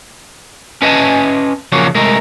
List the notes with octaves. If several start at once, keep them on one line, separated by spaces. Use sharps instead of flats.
C#4 B4 D#5 E5 G#5 A5
C#3 F3 F#3 A#3 C#4 F#4
C2 G#3 A3 A#4